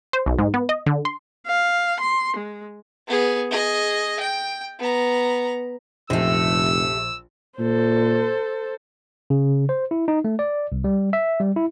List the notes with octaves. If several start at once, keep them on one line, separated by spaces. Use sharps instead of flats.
C5
B1
G#2
B3
D#5
D3
C6
F5
C6
G#3
B3 G#4
G#4 D#5
G5
B3 A#5
F1 A#1 C3 A3 E6
A#2 A4 C5
C#3
C5
E4
D#4
A3
D5
C2
G3
E5
G3
E4